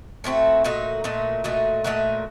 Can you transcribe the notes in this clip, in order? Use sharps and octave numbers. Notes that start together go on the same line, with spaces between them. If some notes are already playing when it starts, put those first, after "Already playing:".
A2 A3 C4 F#4
A#2 A3 D#4 F#4
A#2 A3 D#4 F#4
A#2 A3 D#4 F#4
A#2 A3 D#4 F#4